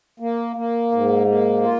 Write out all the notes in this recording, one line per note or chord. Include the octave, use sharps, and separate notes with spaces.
A#3
A#3
G#2
A#3
F4